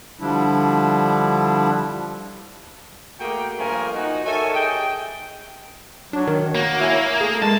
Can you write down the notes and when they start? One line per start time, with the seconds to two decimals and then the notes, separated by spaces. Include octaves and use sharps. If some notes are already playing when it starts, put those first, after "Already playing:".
0.20 D3 F3 G3 D4 E4
3.20 A3 A#3 F#4 G#4 A#4 G5
3.58 G2 F3 A3 A#3 A#4 G#5
3.93 D#4 F#4
4.25 A4 A#4 C#5 E5 G#5 A5
4.53 G4 G#4 D#5 G5
6.13 F#3 D4
6.28 D#3
6.55 A#3 F#4
6.80 E4 C#5 G#5
7.21 A3 G#4
7.42 G#3 A5